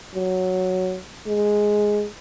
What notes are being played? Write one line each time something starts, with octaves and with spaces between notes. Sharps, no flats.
F#3
G#3